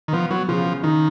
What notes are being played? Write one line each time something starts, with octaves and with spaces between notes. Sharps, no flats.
D#3
F3 B3
F#3 B3
C#3 F3
C#3
D#3 D#4